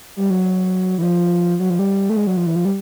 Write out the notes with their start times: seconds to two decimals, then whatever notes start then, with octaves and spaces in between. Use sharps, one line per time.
0.17 G3
0.30 F#3
0.98 E3
1.02 F3
1.60 F#3
1.70 F3
1.79 G3
2.10 A3
2.17 G#3
2.27 F#3
2.37 F3
2.46 E3
2.56 F3
2.65 G3